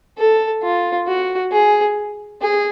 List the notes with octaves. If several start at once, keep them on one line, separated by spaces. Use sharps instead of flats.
A4
F4
F#4
G#4
G#4